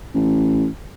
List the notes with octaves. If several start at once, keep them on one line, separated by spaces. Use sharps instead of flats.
A1